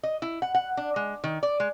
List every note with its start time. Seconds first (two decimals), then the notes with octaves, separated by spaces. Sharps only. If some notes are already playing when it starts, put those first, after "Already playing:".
0.03 D#5
0.22 E4
0.42 F#5
0.55 F#5
0.77 D4
0.96 G#3
1.24 D#3
1.43 D5
1.60 G#3